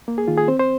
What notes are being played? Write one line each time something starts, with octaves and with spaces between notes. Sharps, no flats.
A#3
G#4
D#3 F4
G#4
C4 C5
C5